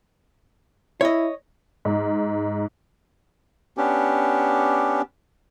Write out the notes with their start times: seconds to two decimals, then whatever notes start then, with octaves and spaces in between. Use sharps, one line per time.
1.01 E4 C#5 D#5
1.85 G#2
3.78 B3 C#4 D4 G4